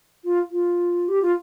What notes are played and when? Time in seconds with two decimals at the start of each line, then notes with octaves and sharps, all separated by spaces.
0.24 F4
0.51 F4
1.08 G4
1.22 F4